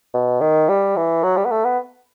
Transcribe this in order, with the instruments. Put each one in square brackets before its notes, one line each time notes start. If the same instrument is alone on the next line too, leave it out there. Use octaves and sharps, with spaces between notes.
[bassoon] B2
D#3
G3
E3
F#3
G3
B3
A3
B3